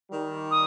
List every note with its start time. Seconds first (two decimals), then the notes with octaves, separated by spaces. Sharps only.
0.11 D#3 G3
0.51 D#6